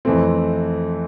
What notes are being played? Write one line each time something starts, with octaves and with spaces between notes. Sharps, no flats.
F2 E3 A3 C4